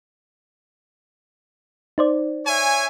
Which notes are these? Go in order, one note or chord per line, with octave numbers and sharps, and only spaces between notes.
D#4 C5 D5
C#5 E5 G#5